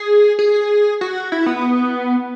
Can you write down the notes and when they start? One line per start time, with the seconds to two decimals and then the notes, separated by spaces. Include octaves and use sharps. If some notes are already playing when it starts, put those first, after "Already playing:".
Already playing: G#4
0.39 G#4
1.01 F#4
1.32 E4
1.46 B3